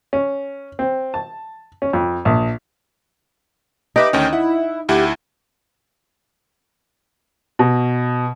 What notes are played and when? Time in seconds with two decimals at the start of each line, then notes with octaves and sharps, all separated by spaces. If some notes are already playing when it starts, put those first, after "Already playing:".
0.13 C#4
0.79 C4
1.14 A5
1.82 C#4
1.93 F2
2.25 A#1
3.96 D#4 G4 B4 E5 D6
4.13 D2 D#3 C#4 G5
4.33 E4 F#5
4.89 D2 E4 G4 F#5
7.59 B2